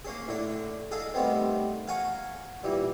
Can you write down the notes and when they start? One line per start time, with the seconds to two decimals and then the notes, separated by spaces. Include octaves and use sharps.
0.05 A#3 C#4 G#4
0.28 A2 D3 D4
0.91 G#4 A4 D#5 F5
1.14 D#3 G3 A3 B3 C4
1.88 F5 F#5 G#5 A#5 C#6
2.63 A#2 E3 G3